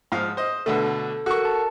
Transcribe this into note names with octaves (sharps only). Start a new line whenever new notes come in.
G#2 F3 F5
C5 D#5
B2 D3 A3 A4
F#4 A4 A#4 C#6
A5